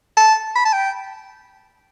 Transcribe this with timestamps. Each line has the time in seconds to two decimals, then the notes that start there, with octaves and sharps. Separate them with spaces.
0.17 A5
0.56 B5
0.65 A5
0.73 G5